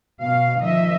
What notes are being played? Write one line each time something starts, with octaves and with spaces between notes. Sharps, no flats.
B2 F5
D#3 F3 D#5 E5